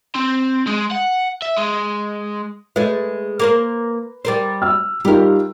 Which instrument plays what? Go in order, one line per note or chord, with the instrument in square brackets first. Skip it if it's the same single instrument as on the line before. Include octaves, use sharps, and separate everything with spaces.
[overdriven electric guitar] C4
G#3
F#5
E5
G#3
[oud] G#3 A3 [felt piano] B4
[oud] A#3 A#4 C5
G3 A#4 C5
[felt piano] E6 F6
[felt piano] G3 D#4 F4 [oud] G4 A#4